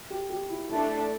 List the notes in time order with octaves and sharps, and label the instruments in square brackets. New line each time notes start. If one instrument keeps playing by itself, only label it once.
[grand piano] G4
G4
E4
[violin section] A3 D4 A4 [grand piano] E4